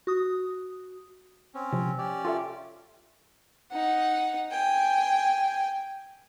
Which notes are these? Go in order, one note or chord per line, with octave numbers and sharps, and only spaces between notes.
F#4 D#6
C4 C#4
C3 F3
C#4 G4 D5
F4 A4 E5
D#4 F#5
G5 G#5